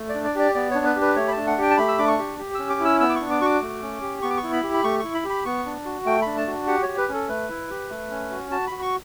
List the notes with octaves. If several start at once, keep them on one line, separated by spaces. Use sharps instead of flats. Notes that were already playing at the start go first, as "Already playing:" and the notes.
Already playing: A3
D5
D4
D5
G4 D5
B3 D5
D4 C#5
B4
G4
B4
A3 C#5
B5
D4 A5
F#5
G4 G5
A5
A3 B5
E6
D4 D6
C#6
G4
G4
C#4 E6
D6
E4
E6
B3 E6
D6
D4 C#6
D6
F#4 C#6 D6
A3
C#4
G4
B3 C#6
D6
C#6
E4
B5
G4
B5
A3 C#6
E4 C#6
B5
G4
B5
B3 C#6
D4
F#4
A3 G5
D4 B5
A5
F#4
G4 F#5
C#5
G4
B4
C#4
A4
A3 B4
E4
G4
A3
C#4
F#4
F#4 A5
F#4 B5
C#6